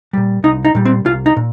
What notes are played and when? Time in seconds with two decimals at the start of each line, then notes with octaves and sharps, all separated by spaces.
0.13 A#2 G3
0.44 C2 D#4
0.65 D#4
0.75 A#2 G3
0.85 C4
1.06 C2 F4
1.26 D#4
1.37 A#2